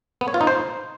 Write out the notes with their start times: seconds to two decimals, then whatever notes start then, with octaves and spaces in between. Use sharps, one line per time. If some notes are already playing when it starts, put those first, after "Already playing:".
0.21 B3
0.28 C#5
0.34 F4
0.41 D#4
0.47 C5